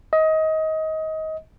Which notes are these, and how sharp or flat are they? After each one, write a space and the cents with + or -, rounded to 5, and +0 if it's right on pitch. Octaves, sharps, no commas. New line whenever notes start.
D#5 +25